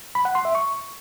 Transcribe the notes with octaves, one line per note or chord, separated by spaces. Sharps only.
B5
F#5
C6
E5
C#6